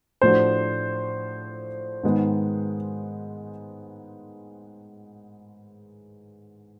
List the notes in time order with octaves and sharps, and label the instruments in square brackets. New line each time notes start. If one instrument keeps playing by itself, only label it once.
[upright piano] A2 F3 A3 D4 F#4 [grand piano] C5
[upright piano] G#2 D#3 G#3 B3